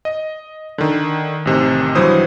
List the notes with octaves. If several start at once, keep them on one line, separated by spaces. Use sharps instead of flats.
D#5
D3 D#3
A1 C3 D#3
G2 E3 F#3 E4 C5 D#6